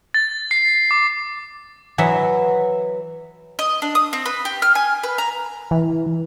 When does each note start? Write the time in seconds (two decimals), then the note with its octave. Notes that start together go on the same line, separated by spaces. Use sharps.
0.14 A6
0.51 C7
0.91 D6
1.98 E3 F#3 E5
3.59 D#5
3.82 D4
3.95 D#6
4.13 C4
4.26 B4
4.45 G4
4.62 F6
4.75 G#5
5.03 B4
5.18 A#5
5.71 E3